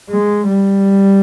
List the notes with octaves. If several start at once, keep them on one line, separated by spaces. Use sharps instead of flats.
G#3
G3